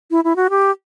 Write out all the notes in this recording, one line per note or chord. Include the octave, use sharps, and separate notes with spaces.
E4
E4
F#4
G4